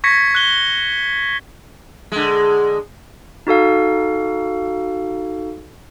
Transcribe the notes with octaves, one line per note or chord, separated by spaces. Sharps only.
C#6 G#6 A#6 B6 C#7
F#6 G7
D3 G#3
D#4 F#4 A4 F5